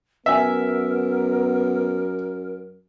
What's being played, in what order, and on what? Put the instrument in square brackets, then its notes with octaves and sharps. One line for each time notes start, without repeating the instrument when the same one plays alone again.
[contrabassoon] F#2 [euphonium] B3 [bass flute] A#4 [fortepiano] E5 G#5